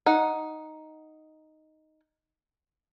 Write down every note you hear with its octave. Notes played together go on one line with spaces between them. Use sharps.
D#4 F#5